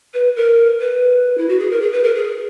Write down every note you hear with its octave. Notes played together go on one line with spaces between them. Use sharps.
B4
A#4
B4
E4
F#4
G#4
A#4
G#4
B4
A#4
G#4